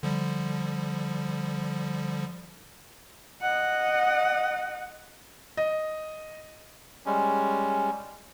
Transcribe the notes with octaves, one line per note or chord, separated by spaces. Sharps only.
D3 F3 G3
D#5 F#5
D#5
G3 G#3 C#4